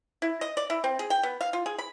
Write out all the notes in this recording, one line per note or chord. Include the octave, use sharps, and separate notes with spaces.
E4
D#5
D5
E4
C4
G#4
G5
B3
F5
F4
G#4
B5